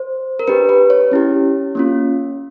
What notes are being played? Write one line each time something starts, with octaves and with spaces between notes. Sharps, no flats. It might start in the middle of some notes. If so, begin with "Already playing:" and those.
Already playing: C5
A#4
D4 G4 B4
B4
C#5
C#4 E4 G4
A#3 C#4 F4